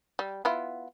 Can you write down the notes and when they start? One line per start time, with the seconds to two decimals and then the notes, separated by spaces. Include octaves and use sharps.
0.19 G3
0.45 B3 E4 F4